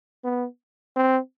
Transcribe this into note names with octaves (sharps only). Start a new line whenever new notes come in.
B3
C4